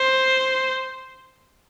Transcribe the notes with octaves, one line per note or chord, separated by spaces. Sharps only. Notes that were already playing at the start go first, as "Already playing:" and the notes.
Already playing: C5